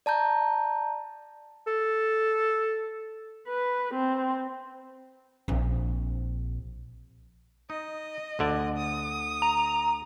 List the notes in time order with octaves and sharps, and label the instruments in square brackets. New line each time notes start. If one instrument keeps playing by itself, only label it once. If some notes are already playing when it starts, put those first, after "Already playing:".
[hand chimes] D5 A5 A#5 G6
[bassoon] A4
[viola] B4
C4
[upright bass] A#1 C4
[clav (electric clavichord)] D#4 [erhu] D#5
[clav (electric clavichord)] D2 D3 D5
[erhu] D#6
[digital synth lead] A#5